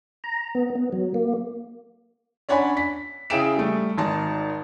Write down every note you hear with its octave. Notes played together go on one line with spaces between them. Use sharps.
A#5
B3
B3
F#3
A#3
C#4 D4 C#5 F#5 G#5 B5
B6
C#3 E4 G#4 G5 D7 E7
G3 A3
G#1 D#4 A5